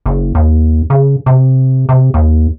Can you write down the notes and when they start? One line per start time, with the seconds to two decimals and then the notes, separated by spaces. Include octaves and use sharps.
0.06 F#1
0.35 D#2
0.90 C#3
1.26 C3
1.89 C3
2.14 D#2